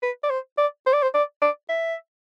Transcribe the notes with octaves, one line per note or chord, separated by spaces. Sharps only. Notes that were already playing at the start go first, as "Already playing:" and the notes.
B4
D5
C5
D5
C5
D5
C5
D5
D5
E5